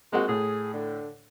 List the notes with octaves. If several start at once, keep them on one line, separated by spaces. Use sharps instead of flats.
G#3 A#3 C4 F#4
A2 G#4
D3